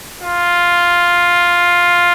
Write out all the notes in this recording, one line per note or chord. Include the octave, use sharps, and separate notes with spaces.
F4